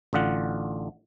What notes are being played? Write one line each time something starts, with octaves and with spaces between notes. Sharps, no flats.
A1 D3 F4 F#5